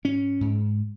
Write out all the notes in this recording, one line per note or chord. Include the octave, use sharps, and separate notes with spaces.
G#2 C#4
G#2